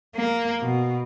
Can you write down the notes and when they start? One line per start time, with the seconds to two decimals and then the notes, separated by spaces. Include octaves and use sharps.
0.16 A#3
0.61 B2